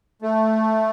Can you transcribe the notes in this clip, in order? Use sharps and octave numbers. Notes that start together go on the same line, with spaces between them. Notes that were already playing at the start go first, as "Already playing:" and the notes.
A3